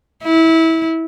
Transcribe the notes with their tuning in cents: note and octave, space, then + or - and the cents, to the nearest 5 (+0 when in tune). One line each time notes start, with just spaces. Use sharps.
E4 -20